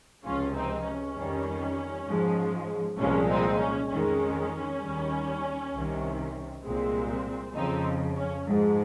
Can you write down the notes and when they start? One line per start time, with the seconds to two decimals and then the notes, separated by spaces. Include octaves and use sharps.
0.24 C#2 C3 F3 G#3 C#4 F4
0.55 C4 D#4
0.85 C#4
1.16 F2 D#3 G3
2.07 G#2 F3 G#3
2.98 C2 A#2 F3 G#3 C#4
3.29 C4 D#4
3.59 C#4
3.89 F2 D#3 G#3 C#4
4.81 D#2 D#3 G3
5.73 C2 C3 D#3
6.63 C2 A#2 G#3 C4
7.55 F2 C#3 F3 C4 D#4
8.16 C#4
8.46 G#2 F3 G#3